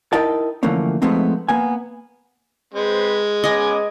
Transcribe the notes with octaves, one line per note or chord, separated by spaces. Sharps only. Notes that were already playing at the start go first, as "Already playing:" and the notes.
D#4 E4 A#4 D#5 G5 A5
D3 E3 F3 A3 A#3 C#4
F3 G#3 A3 B3 C4 D#4
A#3 B3 G#5
G#3 C4 B4 C5
B3 C#4 D#5 G#5 D6